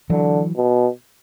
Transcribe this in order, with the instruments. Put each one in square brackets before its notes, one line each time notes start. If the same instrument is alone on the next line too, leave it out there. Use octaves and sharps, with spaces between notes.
[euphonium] D3 [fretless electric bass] E3 F#3
[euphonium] B2